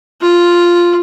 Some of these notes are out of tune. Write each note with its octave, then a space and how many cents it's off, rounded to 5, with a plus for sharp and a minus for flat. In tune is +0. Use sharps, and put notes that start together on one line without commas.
F4 +0